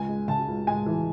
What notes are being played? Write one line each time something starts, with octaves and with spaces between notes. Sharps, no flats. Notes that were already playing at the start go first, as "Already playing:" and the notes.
Already playing: C#2 G#5
G#3
C#3 A5
C#2
G#3 G#5
E3